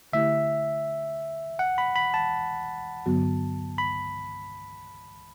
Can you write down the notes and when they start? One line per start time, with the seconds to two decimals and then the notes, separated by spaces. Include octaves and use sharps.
0.13 D3 A3 E4 G4 E5
1.59 F#5
1.78 B5
1.96 B5
2.14 A5
3.06 G2 D3 F#3 B3 F#4
3.78 B5